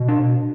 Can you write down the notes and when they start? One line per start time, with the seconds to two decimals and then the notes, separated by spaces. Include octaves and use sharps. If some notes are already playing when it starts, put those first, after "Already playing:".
Already playing: B2
0.08 D4